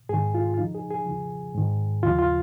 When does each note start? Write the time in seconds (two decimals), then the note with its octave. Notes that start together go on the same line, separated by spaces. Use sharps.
0.09 G#2 D#3 G#4
0.35 F4
0.54 F4
0.58 F2 C#3 F3 D#4
0.75 G#4
0.91 G#4
1.06 F2 C#3 F3
1.55 G#2 D#3
2.03 D#2 C#3 F3 F4
2.19 F4